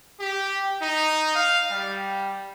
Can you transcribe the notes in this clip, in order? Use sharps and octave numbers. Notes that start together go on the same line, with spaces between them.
G4
D#4
F5
G3